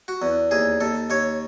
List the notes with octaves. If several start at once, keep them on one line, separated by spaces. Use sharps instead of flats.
F#4
E2
D#2 G#4
D#2 A4
D#2 C#5